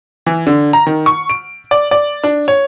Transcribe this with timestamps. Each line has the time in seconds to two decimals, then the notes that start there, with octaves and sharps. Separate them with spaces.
0.26 E3
0.47 D3
0.73 A#5
0.87 D#3
1.06 C#6
1.30 D7
1.71 D5
1.91 D5
2.23 D4
2.48 C#5